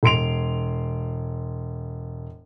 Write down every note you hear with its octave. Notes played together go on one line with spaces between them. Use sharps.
E1 C6 D7 F7